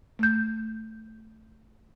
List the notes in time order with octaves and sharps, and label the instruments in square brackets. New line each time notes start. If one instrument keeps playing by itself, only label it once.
[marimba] A3 G6